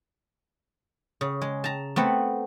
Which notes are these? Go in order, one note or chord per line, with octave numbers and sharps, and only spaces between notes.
C#3
G#3
A5 A#5
A3 B3 C4 F#5